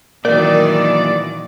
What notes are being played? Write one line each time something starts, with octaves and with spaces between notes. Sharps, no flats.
A#2 D#3 E3 F#3 A#4 D5